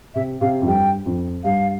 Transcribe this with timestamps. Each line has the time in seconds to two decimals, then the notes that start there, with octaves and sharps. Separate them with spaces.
0.15 C3 E5
0.41 C3 F5
0.62 F2
0.67 G2 G5
1.06 F2
1.44 G2 F5